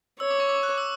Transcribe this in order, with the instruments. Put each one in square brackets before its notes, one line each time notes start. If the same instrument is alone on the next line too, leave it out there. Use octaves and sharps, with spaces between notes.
[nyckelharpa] C#5 [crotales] E6
[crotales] D6
C#6
D6
F#6
E6